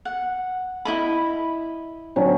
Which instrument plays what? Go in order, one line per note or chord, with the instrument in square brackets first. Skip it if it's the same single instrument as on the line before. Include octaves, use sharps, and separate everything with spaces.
[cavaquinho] F#5
E4 D#5 B5
[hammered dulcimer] D3 F#3 C#4